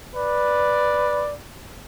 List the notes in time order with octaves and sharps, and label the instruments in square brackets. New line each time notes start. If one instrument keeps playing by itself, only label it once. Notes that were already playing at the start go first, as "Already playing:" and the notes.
[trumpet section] B4 D5